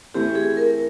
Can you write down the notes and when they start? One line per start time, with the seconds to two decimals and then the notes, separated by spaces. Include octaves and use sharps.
0.14 E3 A3 C4 E4 G4
0.35 G#4
0.57 A#4